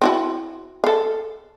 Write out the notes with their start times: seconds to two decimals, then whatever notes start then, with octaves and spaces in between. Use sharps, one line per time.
0.02 C4 E4 F#4
0.84 A4 F5